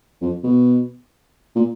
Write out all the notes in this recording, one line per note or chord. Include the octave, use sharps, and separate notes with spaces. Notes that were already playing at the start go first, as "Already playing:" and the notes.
F2
B2
A#2